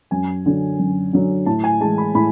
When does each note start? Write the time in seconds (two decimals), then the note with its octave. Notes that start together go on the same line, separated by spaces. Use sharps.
0.11 F#2 G#5
0.46 D3 F#3
0.80 F#2
1.13 D3 F#3
1.46 A2 A5
1.64 G#5
1.80 E3 G#3 A5
1.98 B5
2.15 A2 B5